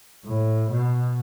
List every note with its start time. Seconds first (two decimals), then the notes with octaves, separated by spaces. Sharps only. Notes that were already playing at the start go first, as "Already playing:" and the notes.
0.25 A2
0.71 B2